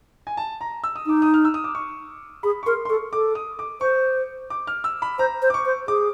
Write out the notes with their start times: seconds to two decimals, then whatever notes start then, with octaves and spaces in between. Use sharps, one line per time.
0.27 G#5
0.37 A5
0.61 A#5
0.84 E6
0.96 D#6
1.06 D#4 D6
1.22 D#6
1.34 F6
1.45 E6
1.54 D#6
1.64 D6
1.75 C#6
2.43 G#4 B5
2.63 C#6
2.66 A#4 C6
2.85 C6
2.89 A4 C#6
3.13 A4 D6
3.35 D#6
3.59 D6
3.81 C5 C#6
4.50 D6
4.67 F6
4.84 E6
5.02 B5
5.19 C5 A#5
5.42 C5
5.50 D6
5.54 C#6
5.65 C5
5.88 G#4 D6